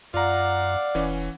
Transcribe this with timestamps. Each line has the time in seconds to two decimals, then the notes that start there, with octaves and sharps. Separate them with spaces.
0.14 F#2 F4 D5 F5 F#5 A#5
0.95 E1 E3 C#4